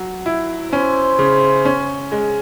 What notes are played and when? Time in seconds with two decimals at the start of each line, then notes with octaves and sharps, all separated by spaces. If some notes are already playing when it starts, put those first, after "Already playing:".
Already playing: F#3
0.26 E4
0.72 C#4 C5
1.19 C#3
1.65 C#4
2.12 G#3